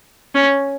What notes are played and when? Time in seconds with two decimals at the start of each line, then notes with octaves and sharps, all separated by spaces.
0.35 C#4